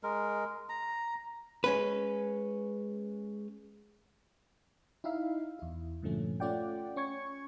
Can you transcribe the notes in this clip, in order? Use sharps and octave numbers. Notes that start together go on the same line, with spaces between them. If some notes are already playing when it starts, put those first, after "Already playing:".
G#3 A#4
A#5
G#3 C#4 B4
D#4 E4 E5 F5
E2 E4
G2 A#2 D3 F3 A3 C#4
A3 C#4 F4 D5 F#5 G5
C#4 C#6 G#6 C#7